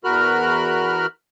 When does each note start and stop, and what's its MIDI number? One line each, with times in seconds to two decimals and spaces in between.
0.04 1.06 40
0.04 1.06 66
0.04 1.06 70
0.04 1.06 83
0.04 1.06 89
0.04 1.06 90